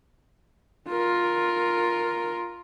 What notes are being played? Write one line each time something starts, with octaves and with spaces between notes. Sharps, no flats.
F4 A#4